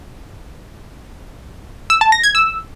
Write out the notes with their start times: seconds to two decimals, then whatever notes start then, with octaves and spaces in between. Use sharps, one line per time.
1.90 E6
2.01 A5
2.12 A#6
2.23 G#6
2.35 E6